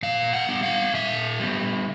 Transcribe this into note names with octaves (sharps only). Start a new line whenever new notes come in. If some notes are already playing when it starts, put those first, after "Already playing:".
A#2 F5
F#5
G3 B3
F5
A#2 E5
G3 B3